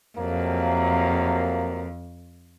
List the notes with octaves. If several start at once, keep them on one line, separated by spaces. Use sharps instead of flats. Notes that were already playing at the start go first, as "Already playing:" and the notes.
F2 C3 F#3 A#3